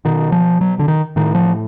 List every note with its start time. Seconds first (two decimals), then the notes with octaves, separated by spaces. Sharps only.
0.05 B2 D#3
0.32 F3
0.61 F#3
0.79 D3
0.88 D#3
1.16 A2 D#3
1.35 F3